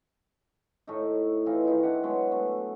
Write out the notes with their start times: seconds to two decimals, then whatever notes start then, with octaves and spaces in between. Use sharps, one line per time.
0.87 A2 A3 D#4
1.46 E3 C4 D#4 F4
1.65 D#3 D#4 E4
1.83 D4 G4 F#5
2.04 F#3 G#3 B3
2.32 A3 B3